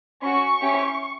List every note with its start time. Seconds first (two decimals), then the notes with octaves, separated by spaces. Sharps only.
0.23 C#4 F#4 C#6
0.61 C#4 E4 G4